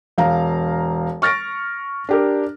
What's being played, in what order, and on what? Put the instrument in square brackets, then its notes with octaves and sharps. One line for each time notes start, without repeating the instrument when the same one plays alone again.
[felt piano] E1 F5 A#5
C#6 F6 A6 A#6 D7
D4 G4 A#4